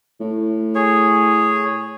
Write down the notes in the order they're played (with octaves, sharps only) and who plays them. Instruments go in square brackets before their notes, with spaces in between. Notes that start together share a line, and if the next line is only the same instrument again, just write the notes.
[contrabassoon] A2
[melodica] G#4 C#5